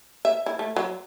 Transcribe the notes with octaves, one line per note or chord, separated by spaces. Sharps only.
E5
E4
A3
F#3